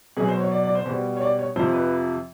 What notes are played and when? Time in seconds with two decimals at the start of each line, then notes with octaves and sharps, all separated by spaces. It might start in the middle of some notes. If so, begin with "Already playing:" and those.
0.17 B2 F#3 G#4
0.28 C5
0.40 C#5
0.51 D5
0.64 D5
0.75 C5
0.86 B2 G3
1.17 C#5
1.21 D5
1.39 C#5
1.56 F2 C3 F3 C5
1.73 B4